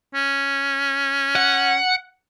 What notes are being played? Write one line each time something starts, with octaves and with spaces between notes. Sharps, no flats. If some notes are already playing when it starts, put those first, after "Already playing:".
C#4
F#5